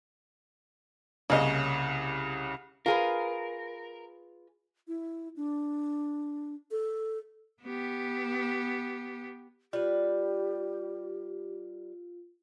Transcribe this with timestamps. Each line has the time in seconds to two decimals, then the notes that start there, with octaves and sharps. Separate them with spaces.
1.30 C2 C#3 A#3 C#4 D#5
2.86 F4 G#4 A#4 B4
4.88 E4
5.36 D4
6.71 A4
7.63 B3 G4
9.73 G3 F4 G4 B4